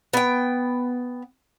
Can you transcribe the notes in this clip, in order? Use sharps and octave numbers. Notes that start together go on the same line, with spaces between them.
B3 G5